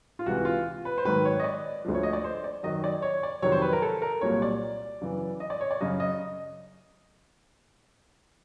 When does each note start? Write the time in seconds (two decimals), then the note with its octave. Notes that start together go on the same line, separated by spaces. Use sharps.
0.19 F4
0.26 C#2 C3 E3 F#4
0.45 F4
0.85 B4
0.98 C5
1.05 G#2 D#3 F#3 B4
1.25 C#5
1.40 D#5
1.44 D5
1.85 D2 D3 F3
1.94 C#5
2.03 D#5
2.13 D5
2.24 C5
2.44 D5
2.63 F#2 D#3 F#3 D#5
2.84 D5
3.02 C#5
3.23 D5
3.42 F2 C3 D#3 F#3 C#5
3.52 C5
3.62 B4
3.73 A#4
3.82 A4
4.02 A#4
4.21 C2 A#2 F#3 C#5
4.42 D5
5.01 F#2 C#3 E3
5.40 D#5
5.50 D5
5.61 C#5
5.71 D5
5.81 F#2 C#3 F#3 D#5
6.00 D#5